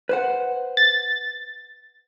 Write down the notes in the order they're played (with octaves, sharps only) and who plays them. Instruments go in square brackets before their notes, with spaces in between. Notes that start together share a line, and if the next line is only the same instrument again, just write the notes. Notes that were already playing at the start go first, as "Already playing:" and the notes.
[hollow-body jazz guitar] B4 C5 F#5
[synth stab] A6